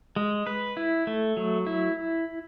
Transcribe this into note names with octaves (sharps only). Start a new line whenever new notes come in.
G#3
B4
E4
A3
F#3
E4